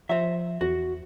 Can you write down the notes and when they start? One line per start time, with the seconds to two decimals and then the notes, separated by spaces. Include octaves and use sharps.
0.09 F3 C5 E5
0.61 E2 F#4